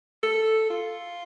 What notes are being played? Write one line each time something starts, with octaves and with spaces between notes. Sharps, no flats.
A4
F4